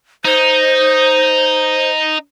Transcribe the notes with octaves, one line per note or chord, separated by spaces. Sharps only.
D#4 C5